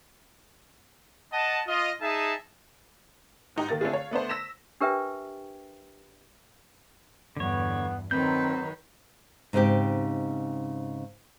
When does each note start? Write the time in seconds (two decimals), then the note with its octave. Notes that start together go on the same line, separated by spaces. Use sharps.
1.31 D#5 F#5 A5
1.67 F4 D#5
2.01 D#4 G#4 E5 A5
3.56 G#2 D#4 G4
3.69 D#3 A#3 A6
3.81 D3 A3 C4 F4 G#4
3.93 C#5 F5
4.11 A3 B3 D4 C5
4.29 E6 A#6 B6 E7
4.81 D4 G4 A#4 B4 E5 G5
7.37 E2 G2 D3 B3 C#5
8.11 D#3 F#3 C4 B4 G6
9.53 G#2 C#3 C4 D#4 G4